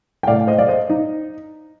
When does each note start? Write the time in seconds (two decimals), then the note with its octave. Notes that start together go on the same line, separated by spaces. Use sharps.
0.23 G5
0.27 A2 A3 D5 F5
0.47 C5 D#5
0.58 D5 F5
0.68 C5 D#5
0.90 D#4